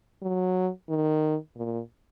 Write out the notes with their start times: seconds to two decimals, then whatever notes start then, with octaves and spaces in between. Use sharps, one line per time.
0.22 F#3
0.89 D#3
1.56 A#2